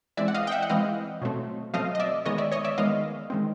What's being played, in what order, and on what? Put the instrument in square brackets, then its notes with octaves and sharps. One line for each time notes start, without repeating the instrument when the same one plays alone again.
[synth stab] E3 G#3 C4 D5 E5
F#5
D#5 F5
G5
E5 F#5
F#5
E3 G#3 C4 D#5 F5
B2 F#3 A3 C4
B2 F#3 A3 C4 D#5 F5
D#5
D5 E5
D#3 G#3 B3 C#5 D#5
D5 E5
C#5 D#5
D5 E5
D#3 G#3 B3 D#5 F5
D#3 G#3 C4